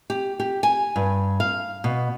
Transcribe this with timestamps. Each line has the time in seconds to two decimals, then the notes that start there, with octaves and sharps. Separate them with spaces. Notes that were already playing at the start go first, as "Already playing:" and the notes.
0.10 G4
0.40 G4
0.63 G#5
0.96 G2
1.40 F5
1.84 B2